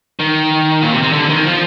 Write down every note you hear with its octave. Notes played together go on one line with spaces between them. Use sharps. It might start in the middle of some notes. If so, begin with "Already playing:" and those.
D#3
A#2
C3
C3
D3
D#3
F3